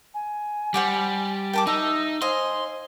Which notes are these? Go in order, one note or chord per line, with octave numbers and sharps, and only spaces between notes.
G#5
G3 C5 F#5 D6
A#4 G5 A5 D6
D#4 E5 E6
C5 D#5 F5 G#5 C6